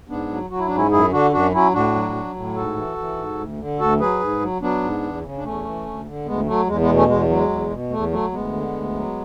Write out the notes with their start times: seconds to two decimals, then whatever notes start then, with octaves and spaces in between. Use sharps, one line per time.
0.09 G#2 B3 D4
0.30 F#3
0.50 F#3 F#4
0.58 E4
0.67 D4
0.71 G#2 C#4 E4
0.91 F#2 E4 G#4
1.12 D3 D4 F#4
1.32 F#2 D4 F#4
1.53 F#3 C#4 E4
1.74 A2 D4 F#4
1.94 F#3
2.15 F#3
2.35 A2
2.56 G#2 F#4 A4
2.76 E3
2.97 E3
3.17 G#2
3.38 D2
3.59 D3
3.79 D2 F#4 A4
4.00 F#3 G#4 B4
4.20 G#2
4.41 F#3
4.61 F#3 B3 D4
4.82 G#2
5.03 E2
5.24 C#3
5.38 D4
5.44 E2 A3 C#4
5.64 E3
5.85 D2
6.06 D3
6.26 D2 G#3 B3
6.47 F#3 A3
6.67 E2 G#3
6.81 G#3 B3
6.88 B2
6.94 A3 C#4
7.08 E2 G#3
7.29 F#3
7.35 G#3
7.49 E2
7.70 B2
7.90 E2 A3
8.11 F#3 A3
8.32 D2 G#3 B3
8.52 D3
8.73 D2
8.94 F#3